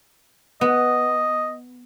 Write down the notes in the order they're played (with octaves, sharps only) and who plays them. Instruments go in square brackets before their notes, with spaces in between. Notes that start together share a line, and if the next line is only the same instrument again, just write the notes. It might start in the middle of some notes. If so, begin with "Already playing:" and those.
[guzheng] B3 [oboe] D#5